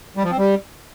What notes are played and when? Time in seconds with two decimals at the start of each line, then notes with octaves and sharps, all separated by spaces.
0.17 G3
0.24 F3
0.31 C4
0.38 G3